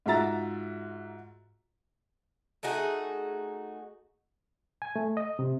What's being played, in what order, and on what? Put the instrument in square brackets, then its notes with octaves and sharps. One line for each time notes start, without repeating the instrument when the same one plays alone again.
[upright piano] G#2 F4 F#4 E5 A#5 A6
[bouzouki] A3 D#4 F#4 G#4
[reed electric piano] G#5
A3
D#5
C3